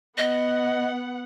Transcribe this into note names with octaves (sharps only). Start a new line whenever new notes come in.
B3 D#5 F#5